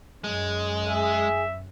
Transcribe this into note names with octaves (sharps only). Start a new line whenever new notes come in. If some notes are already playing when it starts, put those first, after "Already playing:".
F#2 G#3
G#4 E5